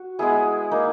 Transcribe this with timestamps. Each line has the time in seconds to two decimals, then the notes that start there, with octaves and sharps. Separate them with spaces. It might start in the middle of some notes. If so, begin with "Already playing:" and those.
Already playing: F#4
0.19 G#3 B3 E4 G#4
0.71 A#3 D#4